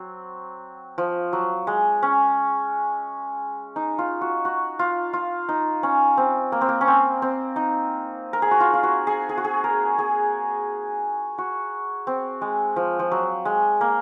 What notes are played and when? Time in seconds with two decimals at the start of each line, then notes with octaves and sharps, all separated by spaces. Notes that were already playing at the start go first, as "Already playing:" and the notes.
Already playing: F#3 C4
0.98 F3
1.33 F#3
1.67 G#3
2.03 C#4
3.76 D#4
3.99 F4
4.21 F#4
4.45 F#4
4.79 F4
5.13 F4
5.49 D#4
5.83 C#4
6.17 C4
6.52 A#3
6.61 C4
6.69 A#3
6.81 C#4
6.88 C4
7.22 C4
7.56 D#4
8.33 A#4
8.42 G#4
8.51 F#4
8.60 F4
8.74 F4
8.83 F#4
9.07 G#4
9.29 G#4
9.38 F#4
9.44 G#4
9.64 A#4
9.99 G#4
11.38 F#4
12.07 C4
12.42 G#3
12.76 F3
12.99 F3
13.11 F#3
13.45 G#3
13.81 A#3